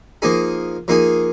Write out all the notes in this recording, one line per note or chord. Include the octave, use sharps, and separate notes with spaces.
F3 A#3 D#4 G#4
F3 A#3 D#4 G#4